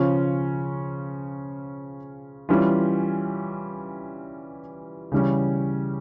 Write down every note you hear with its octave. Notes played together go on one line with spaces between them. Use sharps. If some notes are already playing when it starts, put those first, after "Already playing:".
Already playing: C#3 F3 C#4 F4
E3 G3 C#4 F4
C#3 E3 G3 C#4